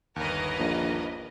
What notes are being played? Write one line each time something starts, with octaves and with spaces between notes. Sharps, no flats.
G1 D#2 A#4 B4 D#5
A#1